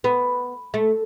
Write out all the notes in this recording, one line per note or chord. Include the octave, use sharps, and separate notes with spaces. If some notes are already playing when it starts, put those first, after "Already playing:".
B3
A3